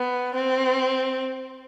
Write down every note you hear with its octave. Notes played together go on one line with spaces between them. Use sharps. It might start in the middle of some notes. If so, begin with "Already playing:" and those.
Already playing: B3
C4